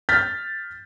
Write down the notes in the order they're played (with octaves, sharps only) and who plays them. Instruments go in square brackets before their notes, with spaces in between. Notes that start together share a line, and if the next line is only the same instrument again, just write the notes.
[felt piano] F6 G6 A6 B6